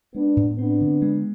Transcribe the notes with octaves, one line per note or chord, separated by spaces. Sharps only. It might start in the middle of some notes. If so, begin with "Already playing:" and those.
G#3 B3 D4
A2
B3 C4 D4
D3
G#3